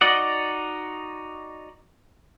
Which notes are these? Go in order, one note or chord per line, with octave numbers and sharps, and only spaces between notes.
D#4 F#4 D5 D#5 F#5